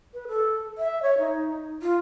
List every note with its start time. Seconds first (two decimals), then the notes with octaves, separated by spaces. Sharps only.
0.14 B4
0.28 A4
0.78 E5
1.03 C#5
1.19 D#4
1.82 F4